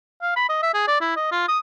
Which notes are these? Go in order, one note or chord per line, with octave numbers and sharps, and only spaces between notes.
F5
B5
D#5
E5
G#4
D5
E4
D#5
F4
D#6